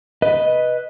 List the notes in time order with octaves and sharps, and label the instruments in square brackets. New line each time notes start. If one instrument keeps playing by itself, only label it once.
[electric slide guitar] B4 D#5